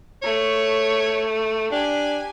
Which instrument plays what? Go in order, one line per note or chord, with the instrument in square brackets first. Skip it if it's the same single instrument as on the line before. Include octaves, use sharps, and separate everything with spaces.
[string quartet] A3 [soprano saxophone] C#5
[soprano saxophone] D4 [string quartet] G4 G#5